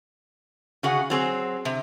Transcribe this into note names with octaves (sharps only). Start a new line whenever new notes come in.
C#3 F#4 G#4 F#5
F#3 C4 G#4
C3